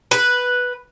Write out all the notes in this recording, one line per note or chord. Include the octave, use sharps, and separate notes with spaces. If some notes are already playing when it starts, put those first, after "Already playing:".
B4